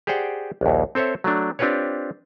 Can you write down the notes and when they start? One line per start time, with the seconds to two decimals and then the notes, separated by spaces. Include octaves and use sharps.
0.07 G4 G#4 C5 D5 F#5 G5
0.61 A#1 D#2
0.95 C4 A4 C5 C#5 E5
1.24 F#3 A3 D4
1.59 C4 D4 F4 G4 B4 C#5